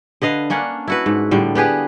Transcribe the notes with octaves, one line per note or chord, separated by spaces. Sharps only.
D3 B4 D#5 F5
A#3 C#4 D4 F#5
E4 F#4 B4
G#2
A2 D3 G3
B3 G4 G#4 B4